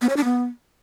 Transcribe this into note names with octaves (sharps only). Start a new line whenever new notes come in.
B3
C#5
D4
B3